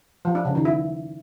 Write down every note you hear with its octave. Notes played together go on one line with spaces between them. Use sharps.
F3
D4
C#3
D#3
E4